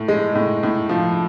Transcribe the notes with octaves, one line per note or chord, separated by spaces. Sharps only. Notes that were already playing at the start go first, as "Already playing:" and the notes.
Already playing: A2
G#3
A2
A2
F3